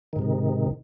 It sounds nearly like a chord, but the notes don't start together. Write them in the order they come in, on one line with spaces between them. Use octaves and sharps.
D#3 G#2 C3